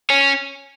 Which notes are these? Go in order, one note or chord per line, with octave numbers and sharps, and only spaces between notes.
C#4